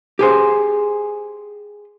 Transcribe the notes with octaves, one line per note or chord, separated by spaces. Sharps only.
G4 G#4 C5